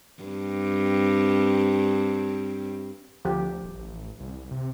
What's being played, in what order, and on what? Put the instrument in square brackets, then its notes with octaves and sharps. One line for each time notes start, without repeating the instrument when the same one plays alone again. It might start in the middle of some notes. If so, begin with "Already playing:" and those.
[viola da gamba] G2 C4
[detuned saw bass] D2 [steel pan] F3 G4
[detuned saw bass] D#1
A1
C2
C3